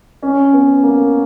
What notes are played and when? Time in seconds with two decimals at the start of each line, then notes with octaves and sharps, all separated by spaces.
0.22 C#4
0.53 B3
0.83 A#3